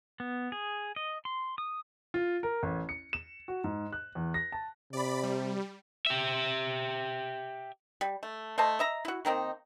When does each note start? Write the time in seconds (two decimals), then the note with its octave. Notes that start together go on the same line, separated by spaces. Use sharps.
0.20 B3
0.52 G#4
0.96 D#5
1.25 C6
1.58 D#6
2.14 F4
2.43 A#4
2.63 A1
2.89 C#7
3.13 E7
3.48 F#4
3.64 G#2
3.93 F#6
4.15 E2
4.34 A#6
4.52 A5
4.93 C3 D5 B5
5.23 G3
6.06 G4 E5
8.01 G3
8.23 A3
8.58 A3 C5 D#5 A5
8.79 D#5 E5 A#5
9.05 E4 F#4
9.25 D#3 A#3 C4 D#4